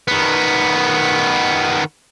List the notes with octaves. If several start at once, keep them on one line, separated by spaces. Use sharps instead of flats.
D#3 B3